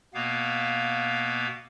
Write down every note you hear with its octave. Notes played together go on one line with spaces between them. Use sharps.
B2 A#3 B3 F5